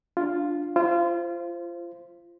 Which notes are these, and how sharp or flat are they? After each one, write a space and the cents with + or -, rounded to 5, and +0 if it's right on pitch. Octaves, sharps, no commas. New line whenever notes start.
D4 +0 F4 +0
F4 -25 C5 +0